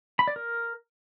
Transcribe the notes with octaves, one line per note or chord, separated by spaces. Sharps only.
B5
D5
A#4